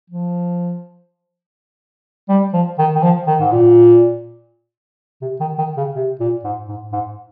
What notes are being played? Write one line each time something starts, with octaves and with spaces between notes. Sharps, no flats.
F3
G3
F3
D#3
D#3
F3
D#3
G#2
A#2
C3
D#3
D#3
C#3
C3
A#2
G#2
G#2
G#2